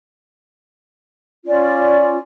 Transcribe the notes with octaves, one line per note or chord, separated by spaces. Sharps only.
C#4 F4 D5